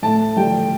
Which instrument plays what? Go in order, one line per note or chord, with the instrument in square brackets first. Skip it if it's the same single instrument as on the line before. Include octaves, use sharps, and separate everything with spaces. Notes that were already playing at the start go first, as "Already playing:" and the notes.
[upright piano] A2 A5
G3 G5